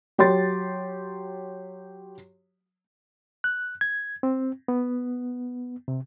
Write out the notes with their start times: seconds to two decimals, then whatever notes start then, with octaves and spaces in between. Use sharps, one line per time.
0.18 F#3 G4 C#5 C6 A6
3.44 F#6
3.81 G#6
4.23 C4
4.68 B3
5.88 C3